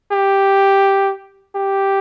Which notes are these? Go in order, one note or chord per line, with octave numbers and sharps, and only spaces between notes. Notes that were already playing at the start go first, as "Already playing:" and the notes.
G4
G4